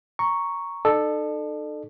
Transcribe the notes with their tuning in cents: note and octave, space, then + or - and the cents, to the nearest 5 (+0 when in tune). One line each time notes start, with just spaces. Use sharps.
A#5 +0 C#6 +0
D#4 -40 A4 +0 D5 +45